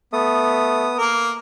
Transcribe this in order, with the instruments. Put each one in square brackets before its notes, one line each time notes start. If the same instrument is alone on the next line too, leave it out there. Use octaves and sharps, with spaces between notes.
[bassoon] A3 [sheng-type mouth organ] B3 D#6
[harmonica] A#3 A#4